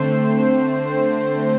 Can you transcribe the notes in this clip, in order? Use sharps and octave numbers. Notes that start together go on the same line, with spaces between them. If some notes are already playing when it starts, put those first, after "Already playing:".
Already playing: D3 A3 C4 C5
C5
C5